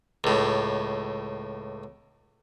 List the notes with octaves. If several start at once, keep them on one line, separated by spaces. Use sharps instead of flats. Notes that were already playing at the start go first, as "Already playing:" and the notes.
C#2 A2